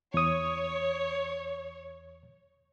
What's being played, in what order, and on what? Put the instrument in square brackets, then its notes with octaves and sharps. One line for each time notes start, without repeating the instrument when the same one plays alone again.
[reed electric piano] E2 D#6 [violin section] C#5